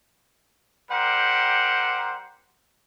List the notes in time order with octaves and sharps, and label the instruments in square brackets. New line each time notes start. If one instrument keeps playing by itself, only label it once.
[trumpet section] G3 G4 A#4 C5 F#5